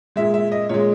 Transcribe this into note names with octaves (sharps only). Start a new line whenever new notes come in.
A#2 G#3 E5
E5
D#5
A#2 G#3 C#5